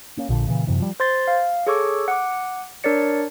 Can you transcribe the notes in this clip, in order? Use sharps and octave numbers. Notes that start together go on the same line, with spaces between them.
A#3 C#4
A#1 A#2 D3
A#2 C#3 E3
F#2 C3 E3
F3 G3
C5 C6 A6
F5
G#4 A4 C#5 C#6 D6 E6
F#5 D6
D4 A#4 C#5 D5 C#7